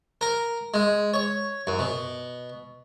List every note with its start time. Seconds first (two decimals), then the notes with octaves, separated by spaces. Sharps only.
0.21 A#4
0.74 G#3
1.14 C#5
1.67 F#2
1.79 B2